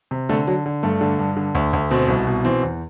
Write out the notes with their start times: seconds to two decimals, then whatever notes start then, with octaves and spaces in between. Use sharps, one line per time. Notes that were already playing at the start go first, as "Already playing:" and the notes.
0.11 C3
0.29 D3 A3
0.47 D3 F#3
0.66 D3
0.83 G2 A3
1.01 D3
1.19 G2
1.37 D3
1.55 D2
1.73 D2
1.91 B2 C4
2.08 C2
2.27 B2
2.45 E3 C4
2.63 E2